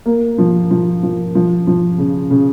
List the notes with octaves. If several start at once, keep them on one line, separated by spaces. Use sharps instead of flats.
A#3
F3
F3
F3
F3
F3
C#3
C#3